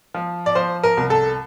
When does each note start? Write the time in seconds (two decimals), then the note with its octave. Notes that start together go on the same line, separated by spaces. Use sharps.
0.14 F3
0.46 D5
0.55 F3 C5
0.83 A#4
0.97 C2
1.10 A4